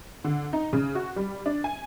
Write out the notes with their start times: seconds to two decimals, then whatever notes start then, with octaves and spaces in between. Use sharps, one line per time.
0.24 D3
0.53 D#4
0.73 C#3
0.95 F#4
1.16 G3
1.46 D4
1.64 G#5